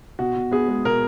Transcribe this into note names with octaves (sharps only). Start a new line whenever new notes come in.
B2 F#4
B2
B3 G#4
G#3
B2 A#4